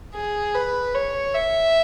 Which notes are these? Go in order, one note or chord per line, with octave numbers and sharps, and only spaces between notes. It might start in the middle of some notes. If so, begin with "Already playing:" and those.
G#4
B4
C#5
E5